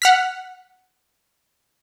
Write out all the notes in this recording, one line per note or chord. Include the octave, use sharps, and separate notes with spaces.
F#5 F6 B6